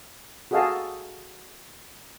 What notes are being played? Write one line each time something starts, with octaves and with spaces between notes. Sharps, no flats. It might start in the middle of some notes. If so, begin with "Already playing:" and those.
F#4 G#4 A4 D#5 F5 A5